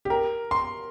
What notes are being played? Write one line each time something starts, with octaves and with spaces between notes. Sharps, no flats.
G4
A#4
C6